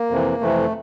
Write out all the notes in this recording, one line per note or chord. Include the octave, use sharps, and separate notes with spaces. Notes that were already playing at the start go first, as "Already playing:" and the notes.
Already playing: A#3
F2 C3 E3
F2 C3 E3 A3